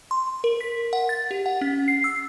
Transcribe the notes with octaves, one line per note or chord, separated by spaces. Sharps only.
C6
A#4
B6
F#5
A6
G4
F#5
C#4
C7
E6